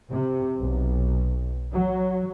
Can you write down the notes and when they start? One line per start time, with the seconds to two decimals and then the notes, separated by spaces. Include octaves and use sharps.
0.10 C3
0.60 B1
1.72 F#3